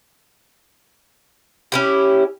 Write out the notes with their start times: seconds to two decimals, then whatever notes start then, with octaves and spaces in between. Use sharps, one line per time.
1.72 C#4 E4 G4